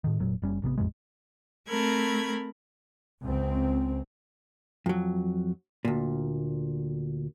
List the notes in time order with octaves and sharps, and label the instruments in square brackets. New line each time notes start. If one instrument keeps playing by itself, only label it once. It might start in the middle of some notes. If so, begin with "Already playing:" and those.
[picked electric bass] A2 D#3
F1 A#2 F#3
F#1 G3 C#4
G#1 C3 D#3 B3
A1 F2 C3 G#3
[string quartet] A3 C4 A#4 B5 G#6
[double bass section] C#2 C4
[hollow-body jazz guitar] F2 F#3
D2 A#2